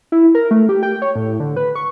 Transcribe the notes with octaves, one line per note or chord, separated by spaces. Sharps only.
E4
A#4
A3
G4
G5
C#5
A2
D3
B4
C#6